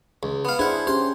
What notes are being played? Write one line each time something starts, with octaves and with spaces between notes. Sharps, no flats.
C#2
B3 F5
D4 E4 G#4 C5 F#5
C#4 G4 C5